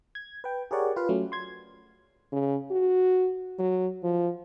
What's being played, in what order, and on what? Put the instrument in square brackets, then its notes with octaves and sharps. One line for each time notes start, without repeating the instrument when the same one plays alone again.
[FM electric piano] G#6
B4 G5
G4 G#4 A#4 C#5 D5 F#5
F4 B4 F5
F#3 A3 C#4
C6 G#6
[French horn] C#3
F#4
F#3
F3